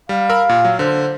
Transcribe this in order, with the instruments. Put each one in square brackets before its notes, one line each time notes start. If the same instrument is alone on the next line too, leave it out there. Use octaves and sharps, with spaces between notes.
[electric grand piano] G3 [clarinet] F5
[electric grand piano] A#4 B5 E6
A#2
F#3
[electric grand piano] D3 [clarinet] C5